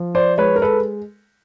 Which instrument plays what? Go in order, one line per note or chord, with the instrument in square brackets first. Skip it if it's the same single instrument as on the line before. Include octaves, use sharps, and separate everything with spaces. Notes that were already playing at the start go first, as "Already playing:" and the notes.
Already playing: [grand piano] F3
C5 D5
G#3 B4 C#5
A#4
A4 B4